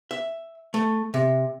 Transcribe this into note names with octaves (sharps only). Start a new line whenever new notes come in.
E5
A3
C3